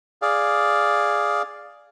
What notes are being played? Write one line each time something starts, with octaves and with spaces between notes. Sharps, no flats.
G#4 D5 F5